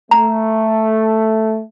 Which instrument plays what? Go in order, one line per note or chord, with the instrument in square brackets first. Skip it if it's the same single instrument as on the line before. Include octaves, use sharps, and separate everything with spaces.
[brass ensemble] A3 [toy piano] A#5